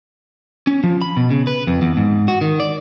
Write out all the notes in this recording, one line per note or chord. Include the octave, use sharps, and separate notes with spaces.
C#4
F3
B5
B2
C#3
B4
F2
E2
G#2
F#4
D#3
D5